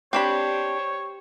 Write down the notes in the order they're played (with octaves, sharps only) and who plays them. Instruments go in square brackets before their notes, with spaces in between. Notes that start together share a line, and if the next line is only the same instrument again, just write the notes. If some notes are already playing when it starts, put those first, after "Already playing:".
[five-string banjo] C4 D4 B5 [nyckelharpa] G4 C5 [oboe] C#5